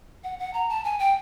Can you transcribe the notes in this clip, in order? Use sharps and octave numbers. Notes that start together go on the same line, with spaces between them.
F#5
F#5
A#5
A5
G#5
G5